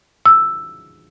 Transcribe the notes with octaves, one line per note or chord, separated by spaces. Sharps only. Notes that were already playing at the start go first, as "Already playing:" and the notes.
E6